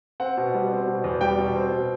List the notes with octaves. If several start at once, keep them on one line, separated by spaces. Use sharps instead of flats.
C4 F#5
B2
G3
C4
B2
E2
G3 G5
B2
C4
B2